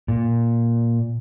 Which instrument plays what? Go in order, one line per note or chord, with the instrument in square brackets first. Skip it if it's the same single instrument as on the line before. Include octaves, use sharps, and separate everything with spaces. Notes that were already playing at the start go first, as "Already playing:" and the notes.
[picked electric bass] A#2